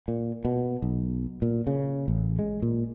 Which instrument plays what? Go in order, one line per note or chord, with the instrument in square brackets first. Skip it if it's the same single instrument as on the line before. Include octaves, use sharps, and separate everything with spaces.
[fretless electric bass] A#2
B2
B1
A#2
C#3
A1
G#3
A#2